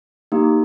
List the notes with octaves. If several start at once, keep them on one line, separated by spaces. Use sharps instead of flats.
A#3 D#4 G4